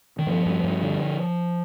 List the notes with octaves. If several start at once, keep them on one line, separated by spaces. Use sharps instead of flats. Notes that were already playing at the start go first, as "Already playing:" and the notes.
D#3
G2 F3
G2
G2
D3